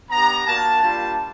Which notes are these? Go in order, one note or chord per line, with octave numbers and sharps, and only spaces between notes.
B3 D4 G4 A#5
A#3 D4 F#4 A5
G3 A#3 D4 F4 A5